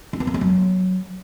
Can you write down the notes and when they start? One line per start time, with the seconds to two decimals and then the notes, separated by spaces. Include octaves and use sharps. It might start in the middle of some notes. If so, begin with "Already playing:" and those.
0.13 D4
0.20 B3
0.27 A#3
0.34 C#4
0.41 F#3